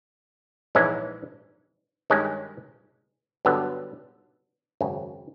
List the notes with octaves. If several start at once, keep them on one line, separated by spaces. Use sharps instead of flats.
A#1 G#2 E3 G#3 C#4
G2 D#3 G#3 C#4
G2 D3 F#3 B3
G#1 F#2 C#3